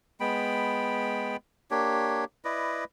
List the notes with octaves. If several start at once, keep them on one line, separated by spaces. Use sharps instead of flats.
G#3 B3 G5 B5
A#3 D4 G4 C#5
E4 B4 D5 D#5